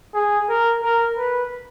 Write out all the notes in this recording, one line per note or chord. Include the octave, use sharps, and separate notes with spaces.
G#4
A#4
A#4
B4